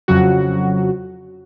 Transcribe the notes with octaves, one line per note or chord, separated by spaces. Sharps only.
F2 C#3 F#3 F#4